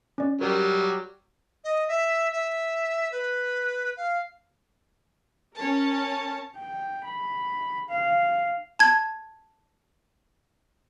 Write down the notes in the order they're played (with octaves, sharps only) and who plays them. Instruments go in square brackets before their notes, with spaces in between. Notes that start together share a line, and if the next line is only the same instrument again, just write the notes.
[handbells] C#4 D5
[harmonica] F#3 G3 [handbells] A#4
[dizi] D#5
E5
E5
B4
F5
[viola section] C#4 A#4 [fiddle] C#5 A5
[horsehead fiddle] G5
B5
F5
[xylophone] A5 G#6